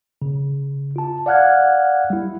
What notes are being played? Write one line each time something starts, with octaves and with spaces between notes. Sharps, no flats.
C#3
F4 A5
D5 F5 F#5 F6 F#6 G#6
G3 E4